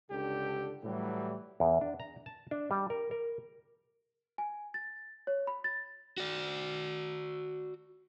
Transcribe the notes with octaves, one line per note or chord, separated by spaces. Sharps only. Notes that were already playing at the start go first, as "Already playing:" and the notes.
C#2 G2 D3 D4 G4 A4
A2 E3 F#3 G3
E2
D4
A#5
A5
D4
G3
A#4
A#4
G#5
A6
C#5
B5
A6
F#4 D5